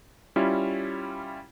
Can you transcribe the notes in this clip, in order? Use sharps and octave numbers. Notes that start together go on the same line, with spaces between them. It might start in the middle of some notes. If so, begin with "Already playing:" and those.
G3 C#4 E4 F4